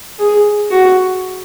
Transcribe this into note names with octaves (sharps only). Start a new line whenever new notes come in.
G#4
F#4